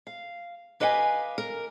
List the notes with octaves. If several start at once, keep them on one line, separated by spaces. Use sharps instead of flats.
F5
G4 B4 D#5 F5 F#5 G#5
A#4